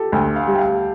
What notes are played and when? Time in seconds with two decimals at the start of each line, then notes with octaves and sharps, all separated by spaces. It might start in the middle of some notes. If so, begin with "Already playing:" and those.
Already playing: F4 G4 A4
0.12 D2 G5
0.36 F5
0.47 G3
0.54 G5
0.59 F5